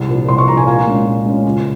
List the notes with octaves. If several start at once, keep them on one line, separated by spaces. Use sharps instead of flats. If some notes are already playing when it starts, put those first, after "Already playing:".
Already playing: C2
A#2 F3
C2 C6
C#6
A#2 F3 A#5
G#5
A#2 F5
G#3 C#4
A#2
G#3 C#4
C#2